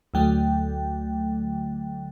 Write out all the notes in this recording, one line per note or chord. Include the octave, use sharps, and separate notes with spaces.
D2 D3 F#3 A3 G5